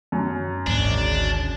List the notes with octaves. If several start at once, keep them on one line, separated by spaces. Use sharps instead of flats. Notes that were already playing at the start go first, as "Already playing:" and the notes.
F#2
G#1 D2 D4